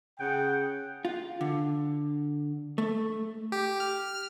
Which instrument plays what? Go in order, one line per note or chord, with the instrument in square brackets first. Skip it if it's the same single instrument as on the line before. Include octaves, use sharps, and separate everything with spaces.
[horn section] C#3 G#4 F#5 G5
[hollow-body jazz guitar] F4
D3
A3
[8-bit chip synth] G4
F6